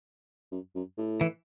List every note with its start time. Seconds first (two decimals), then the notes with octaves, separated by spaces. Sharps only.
0.52 F#2
0.75 F#2
0.98 A2
1.21 E3